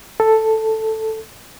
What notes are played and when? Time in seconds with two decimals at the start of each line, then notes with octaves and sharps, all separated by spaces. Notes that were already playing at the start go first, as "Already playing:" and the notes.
0.20 A4